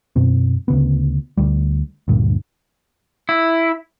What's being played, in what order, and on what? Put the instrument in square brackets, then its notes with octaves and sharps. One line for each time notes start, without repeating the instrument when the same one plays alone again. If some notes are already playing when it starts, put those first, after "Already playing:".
[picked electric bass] F#2 B2 C4
D2 C#3 B3
D2 G3
D2 G2 A#2
[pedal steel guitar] E4